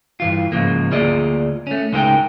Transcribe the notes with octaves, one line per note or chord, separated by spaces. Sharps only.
G2 E3 F4
G#2 C#3 F3 A#3
D2 A#3 F4 G#4 D5 D#5
A3 C#4
C#2 G#3 D#4 A#4 F5 G5